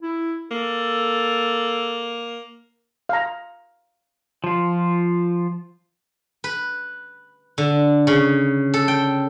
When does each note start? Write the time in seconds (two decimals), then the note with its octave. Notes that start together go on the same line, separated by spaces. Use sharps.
0.02 E4
0.51 A#3 A4
3.09 F5 A#5
4.44 F3 F4
6.44 B4
7.58 D3
8.07 C#3
8.74 A4
8.88 G5